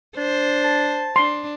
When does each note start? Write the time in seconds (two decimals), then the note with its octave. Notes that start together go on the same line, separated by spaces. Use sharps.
0.17 D4 C5
0.64 A5
1.16 D4 C6